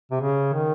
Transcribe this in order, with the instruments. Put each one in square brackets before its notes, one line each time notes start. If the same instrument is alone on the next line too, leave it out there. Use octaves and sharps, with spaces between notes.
[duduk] C3
C#3
D#3